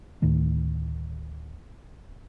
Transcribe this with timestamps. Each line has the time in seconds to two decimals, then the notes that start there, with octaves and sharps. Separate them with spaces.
0.22 D2 A2 D#3 A3